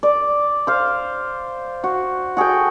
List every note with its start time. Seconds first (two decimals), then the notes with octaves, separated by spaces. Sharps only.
0.03 D5
0.67 C5 F5
1.84 F#4
2.37 F#4 G#4 A4 G5